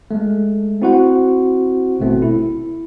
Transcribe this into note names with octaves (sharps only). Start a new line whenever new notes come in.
G#3 A3
C4 E4 F#4 C5 F#5
G#1 B2 A3 C4
E4